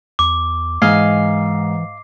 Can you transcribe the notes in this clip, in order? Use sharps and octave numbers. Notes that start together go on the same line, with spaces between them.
E2 D6
G#2 E3 D#5 F5 G#5 C7